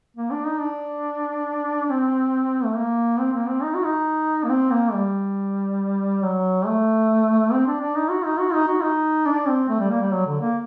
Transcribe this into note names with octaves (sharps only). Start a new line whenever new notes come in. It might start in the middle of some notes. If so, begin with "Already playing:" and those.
A#3
D4
D#4
D4
C4
A3
A#3
C4
A#3
C4
D#4
F#4
D#4
A#3
C4
A#3
G3
F#3
A3
C4
D4
D4
D#4
F#4
D#4
F#4
D#4
F#4
D#4
D4
C4
A3
G3
A#3
G3
F#3
D3
A#3